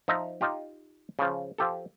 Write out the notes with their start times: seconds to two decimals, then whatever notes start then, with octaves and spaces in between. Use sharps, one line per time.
0.08 F3 D#4 E5 A#5
0.41 D#4 F4 G4
1.19 C#3 F3
1.58 F3 G4 A4